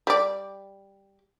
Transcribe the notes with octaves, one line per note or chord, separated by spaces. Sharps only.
G3 D5